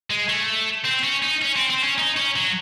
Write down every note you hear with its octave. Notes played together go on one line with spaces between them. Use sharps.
G#3
A3
C4
C#4
D#4
C#4
C4
C4
C#4
D#4
C#4
F#3